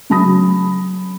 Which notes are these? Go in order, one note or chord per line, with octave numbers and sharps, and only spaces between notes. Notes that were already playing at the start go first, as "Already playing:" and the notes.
C#3 F#3 A5 B5 D#6 A#6